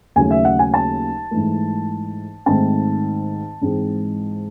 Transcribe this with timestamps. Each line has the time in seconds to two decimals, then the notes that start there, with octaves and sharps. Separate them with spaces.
0.16 D#2 C#3 F#3 A3 G#5
0.31 E5
0.45 F#5
0.59 G#5
0.74 A5
1.31 G#2 E3 A3
2.46 G#2 D#3 A3 C4 A5
3.61 G#2 E3 G#3 C4